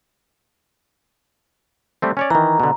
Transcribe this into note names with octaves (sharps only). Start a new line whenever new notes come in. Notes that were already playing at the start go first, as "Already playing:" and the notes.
G3 A3 C4
C#4 C#5 D5
D#3 E3 A#5
B2 D3